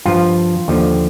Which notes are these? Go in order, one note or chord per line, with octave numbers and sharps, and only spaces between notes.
G2 F3 F4
D#2 D3 F3